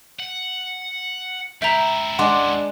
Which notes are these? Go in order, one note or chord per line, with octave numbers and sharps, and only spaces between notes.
F#5
C#2 E4 E5 G5 A#5
G#3 D4 F#5 C6 D6